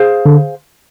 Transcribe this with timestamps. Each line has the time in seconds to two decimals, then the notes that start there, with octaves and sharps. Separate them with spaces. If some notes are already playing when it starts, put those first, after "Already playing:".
Already playing: G#4 C5 F5
0.26 D3